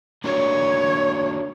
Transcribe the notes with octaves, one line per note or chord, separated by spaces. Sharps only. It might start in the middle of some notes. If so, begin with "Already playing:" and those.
A#3 D4 F#4 A#4 C#5